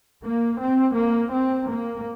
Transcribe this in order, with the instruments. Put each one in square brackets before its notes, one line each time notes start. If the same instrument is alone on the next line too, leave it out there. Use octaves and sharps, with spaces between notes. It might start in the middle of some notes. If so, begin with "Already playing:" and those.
[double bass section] A#3
C4
A#3
C4
A#3